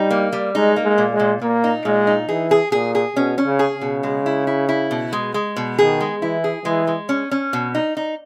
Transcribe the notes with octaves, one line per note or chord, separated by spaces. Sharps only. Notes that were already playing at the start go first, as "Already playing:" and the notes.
Already playing: G3 D#4
A#3
G3
G#3 D#4
A#3
G#3
A#2
G#3
A#2
A#2 A#3
D#4
A#2 G#3
D#4
E3 G#4
G#4
A#2 G#4
G#4
B2 C#4
C#4
C#3
G#4
C#3
B2
G#3
E4
E4
E4
B2
G#3
G#3
B2
D#3 G#4
G#3
E3 E4
G#4
E3 G#3
G#3
C#4
C#4
B2
D#4
D#4